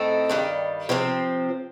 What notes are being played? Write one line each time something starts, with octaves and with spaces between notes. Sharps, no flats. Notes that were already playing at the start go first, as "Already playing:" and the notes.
Already playing: A2 A3 C4 D#4 A4
G2 D#3 G3
C3 F3 C4